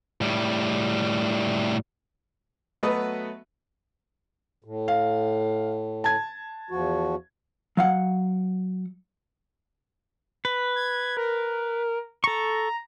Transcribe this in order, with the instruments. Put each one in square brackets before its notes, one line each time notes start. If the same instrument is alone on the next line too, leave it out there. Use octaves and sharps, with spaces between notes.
[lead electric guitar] A2 G3
[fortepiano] F#3 A3 B3 F#4 B4 D#5
[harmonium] A2
[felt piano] F5
A5 G#6
[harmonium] E2 F3 F#4
[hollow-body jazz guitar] F#3 F5 F#5
[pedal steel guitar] B4
[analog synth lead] G#6
A#4
[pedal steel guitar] A4 C#6 [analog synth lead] A#5